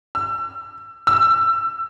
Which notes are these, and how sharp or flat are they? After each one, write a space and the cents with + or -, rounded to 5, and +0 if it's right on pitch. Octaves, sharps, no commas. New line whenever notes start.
E6 +30
E6 +20